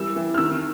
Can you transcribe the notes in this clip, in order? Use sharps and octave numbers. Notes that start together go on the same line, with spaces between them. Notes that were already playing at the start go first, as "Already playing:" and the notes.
Already playing: E3 G3 E6
E3
F6
D#3 E6